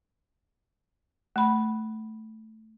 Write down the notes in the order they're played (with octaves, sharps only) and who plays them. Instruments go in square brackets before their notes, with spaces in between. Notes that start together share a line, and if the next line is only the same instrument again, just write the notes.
[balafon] A3 B5